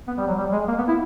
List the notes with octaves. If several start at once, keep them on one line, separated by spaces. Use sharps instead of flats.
B3
G3
F#3
G3
G#3
A#3
B3
E4